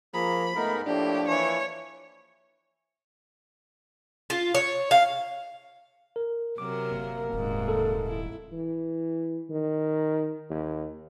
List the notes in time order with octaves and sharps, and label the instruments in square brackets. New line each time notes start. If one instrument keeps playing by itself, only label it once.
[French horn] F3 [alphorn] A#3 [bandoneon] G#4 A#5 [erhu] B5
[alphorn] G#2 [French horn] A3 [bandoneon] B3 D#4 A#4
[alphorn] A2 [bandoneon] F3 A#3 [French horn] D4 [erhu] G4
[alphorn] E3 [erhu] C#5
[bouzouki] F4
C#5
F5
[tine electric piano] A#4
[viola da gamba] C3 F#3 A#4 [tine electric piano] D6
[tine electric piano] G1 [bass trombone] A#3
[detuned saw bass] D#1 [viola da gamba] G#2 C3
[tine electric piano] A4
[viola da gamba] E4
[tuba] E3
D#3
D#2